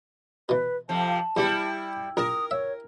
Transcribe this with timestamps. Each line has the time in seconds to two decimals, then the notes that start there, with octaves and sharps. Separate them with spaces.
0.49 B2 E3 B4
0.89 F2 C3 F3 A5
1.37 E2 G3 E4 G4 B5
2.17 A#1 A#4 A5 D#6
2.51 C#5 E5